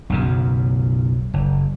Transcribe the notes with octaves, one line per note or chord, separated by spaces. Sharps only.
B1 F#2 C#3
F#1